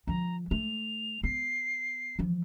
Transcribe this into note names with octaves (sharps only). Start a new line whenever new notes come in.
D3 F3 A#5
A3 F7
B3 C7
E3 F3